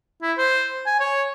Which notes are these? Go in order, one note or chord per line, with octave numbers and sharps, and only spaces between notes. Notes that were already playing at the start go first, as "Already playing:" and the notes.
E4
C5
G#5
C#5